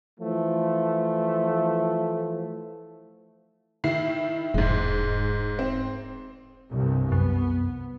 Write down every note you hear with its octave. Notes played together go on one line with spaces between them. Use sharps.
E3 F3 A3
D#3 E4 C7
E1 G#2 G#3
C4
C2 G2
F#2 B3